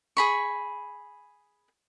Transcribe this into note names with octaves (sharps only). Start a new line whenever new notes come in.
G#4 B5 C#6